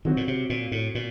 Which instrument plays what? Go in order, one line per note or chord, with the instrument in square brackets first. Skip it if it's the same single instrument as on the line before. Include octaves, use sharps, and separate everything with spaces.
[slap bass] D#3 [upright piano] F#3 C4 F#4
[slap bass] A#2
C3
A#2
A2
A#2